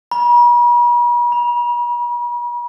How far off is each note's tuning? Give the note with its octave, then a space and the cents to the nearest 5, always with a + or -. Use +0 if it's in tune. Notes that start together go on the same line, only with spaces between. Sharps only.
B5 -45
B5 -30